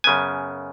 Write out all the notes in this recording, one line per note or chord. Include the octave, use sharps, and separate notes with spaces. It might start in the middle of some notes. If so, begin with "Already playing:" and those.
F#2 C#3 B3 G#5